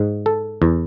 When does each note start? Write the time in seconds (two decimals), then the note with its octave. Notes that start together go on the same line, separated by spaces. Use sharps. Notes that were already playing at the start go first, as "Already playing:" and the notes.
Already playing: G#2
0.26 A4
0.62 E2